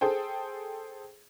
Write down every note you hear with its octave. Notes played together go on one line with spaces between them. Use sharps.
G#4 A4 C5 G5